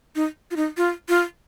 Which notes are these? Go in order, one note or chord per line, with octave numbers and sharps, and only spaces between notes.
D#4
F4
D#4
F4
F4